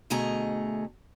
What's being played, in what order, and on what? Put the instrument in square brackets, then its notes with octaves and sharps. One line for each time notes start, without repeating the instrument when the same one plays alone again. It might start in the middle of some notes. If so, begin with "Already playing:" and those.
[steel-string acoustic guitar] D2 B2 A3 G#4 D#5 A#5